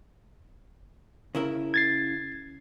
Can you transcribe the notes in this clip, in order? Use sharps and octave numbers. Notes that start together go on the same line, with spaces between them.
C#3 E4 A#4
G#6 A6 C7